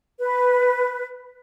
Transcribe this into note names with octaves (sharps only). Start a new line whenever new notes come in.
B4